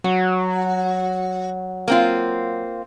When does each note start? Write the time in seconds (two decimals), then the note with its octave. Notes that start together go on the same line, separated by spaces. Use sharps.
0.04 F#3 F#4
1.88 A#3 C4 F4